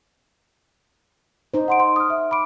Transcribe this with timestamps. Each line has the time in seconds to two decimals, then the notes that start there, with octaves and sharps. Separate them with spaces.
1.54 D#4 C5
1.68 F#5 C6 D7
1.80 C6
1.96 D#6 F6
2.10 E5
2.31 B5 D6 D7